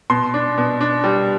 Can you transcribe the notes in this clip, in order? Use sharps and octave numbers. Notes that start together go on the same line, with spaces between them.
B2 C6
D4
B2
D4
G3